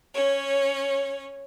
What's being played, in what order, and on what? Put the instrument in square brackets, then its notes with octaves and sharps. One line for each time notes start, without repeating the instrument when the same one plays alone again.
[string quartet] C#4 C#5